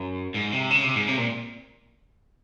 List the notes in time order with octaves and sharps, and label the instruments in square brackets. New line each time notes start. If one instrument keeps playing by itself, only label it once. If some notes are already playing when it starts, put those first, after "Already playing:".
Already playing: [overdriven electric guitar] F#2
G#2
C3
C#3
C3
G#2
C3
A#2